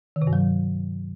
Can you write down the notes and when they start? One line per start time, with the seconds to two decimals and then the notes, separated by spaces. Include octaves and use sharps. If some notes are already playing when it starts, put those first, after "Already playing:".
0.16 D#3
0.22 C3
0.27 G2
0.33 F#3